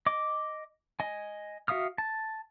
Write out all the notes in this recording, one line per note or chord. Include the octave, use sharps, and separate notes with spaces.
D#5 D6
D#5 G#5
F#4 E5 F5 D#6 F6
A5